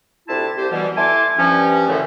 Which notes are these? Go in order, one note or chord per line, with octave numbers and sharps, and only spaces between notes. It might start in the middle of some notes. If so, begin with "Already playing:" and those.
D2 C3 E4 F4 A5
C2 G4 C5
B2 E3 G3
E4 A4 G#5 A5 C6 D6
G2 F3 C#4
F#2 A2 D3 E3 A3